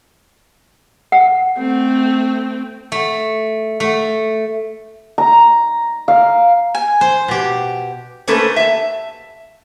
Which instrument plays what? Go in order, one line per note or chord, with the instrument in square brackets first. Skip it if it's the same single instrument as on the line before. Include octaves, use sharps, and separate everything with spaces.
[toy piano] F#5
[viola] A3 C4
[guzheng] A3
A3
[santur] A#5
F5
[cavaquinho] G#5
[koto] C5
B2 G4
[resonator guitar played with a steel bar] A3 A#3 C#4 A4 B4 C5
E5 A5